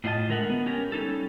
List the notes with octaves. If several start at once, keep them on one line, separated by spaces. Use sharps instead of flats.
A2 D4 F4 D#5 A5
D3 G#3 A#4 E5 F#5
B3
C#4 G4 A#4
G3 C#4 D#4 A4